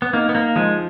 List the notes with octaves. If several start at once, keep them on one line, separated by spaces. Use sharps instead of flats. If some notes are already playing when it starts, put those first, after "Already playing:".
B3
A#3 D#4
B3
A#3
F3 G#3